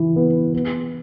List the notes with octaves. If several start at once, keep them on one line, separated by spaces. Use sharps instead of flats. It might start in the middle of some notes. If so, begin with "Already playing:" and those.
Already playing: E3 E4
B3
B3